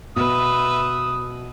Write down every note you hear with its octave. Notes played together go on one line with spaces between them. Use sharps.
B2 B4 E5 D#6